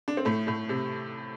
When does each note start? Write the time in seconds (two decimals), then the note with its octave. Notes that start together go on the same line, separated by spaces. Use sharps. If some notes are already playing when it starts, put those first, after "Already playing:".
0.08 D4
0.17 C4
0.25 A2 A3
0.47 A2 A3
0.69 C3